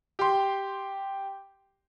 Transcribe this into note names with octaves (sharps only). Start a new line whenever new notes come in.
G4 C6